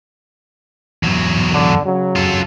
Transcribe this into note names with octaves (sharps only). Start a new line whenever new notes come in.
E2 F#3
D3
C#3 F#3
F4 A4